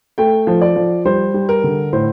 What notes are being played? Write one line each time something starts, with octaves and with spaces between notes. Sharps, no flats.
A3 G5
F3
D5
F3
G3 C5
G3
A#4
D3
A2 C5